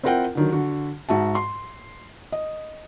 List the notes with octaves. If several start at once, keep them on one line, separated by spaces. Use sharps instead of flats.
C4 E4 F4 A#4 F#5 G5
D3 D#3 F#3
D3 F#4
G#2 F#4 E5 A5
C6
D#5